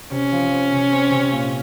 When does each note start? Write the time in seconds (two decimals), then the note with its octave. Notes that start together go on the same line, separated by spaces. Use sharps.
0.11 C3 C#4
0.32 F3
0.51 C4
0.72 C3
0.91 C4
1.11 C3
1.32 A#2